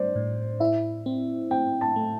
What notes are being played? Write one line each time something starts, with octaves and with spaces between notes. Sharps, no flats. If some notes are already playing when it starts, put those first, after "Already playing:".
Already playing: G3 D4 C5 D5
A2
E4 E5
C4
C4 G5
A5
A3